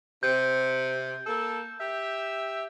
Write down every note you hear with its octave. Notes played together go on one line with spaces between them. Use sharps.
C3 G6
A#3 A4
G4 E5